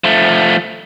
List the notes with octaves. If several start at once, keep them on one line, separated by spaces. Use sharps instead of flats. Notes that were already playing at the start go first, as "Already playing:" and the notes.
F3 A3